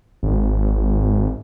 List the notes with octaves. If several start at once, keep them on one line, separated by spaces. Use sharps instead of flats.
G#1